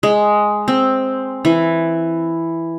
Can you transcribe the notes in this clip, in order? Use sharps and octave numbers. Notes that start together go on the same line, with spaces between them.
G#3
C4
E3